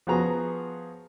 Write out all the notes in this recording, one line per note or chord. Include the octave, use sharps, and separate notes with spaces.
F3 B3 F#4 G#4 A#5